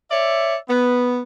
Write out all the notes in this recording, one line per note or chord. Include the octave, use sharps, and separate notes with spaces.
C#5 D5 E5
B3